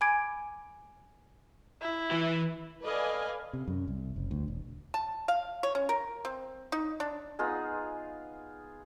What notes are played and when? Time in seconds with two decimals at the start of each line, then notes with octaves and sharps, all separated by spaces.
0.01 G#5 B5 D6 G#6 D7
1.81 E4
2.11 E3 B4
2.83 A4 B4 D5 D#5 F5 G#5
3.53 C3
3.67 F#2
3.88 C2
4.16 F#1
4.31 D2
4.48 E1
4.94 A5
5.28 F5
5.63 C#5
5.75 C#4
5.89 A#4
6.25 C4
6.72 D#4
7.00 D4
7.39 B3 D#4 F4 G#4